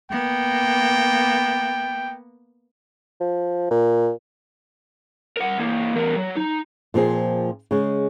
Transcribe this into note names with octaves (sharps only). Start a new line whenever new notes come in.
A#3 B3 G5
F3
A#2
A#4 F#5
E3 A#3
E2 A#4
F#3
D#4
A#2 F3 C4 G#4
C#3 G#3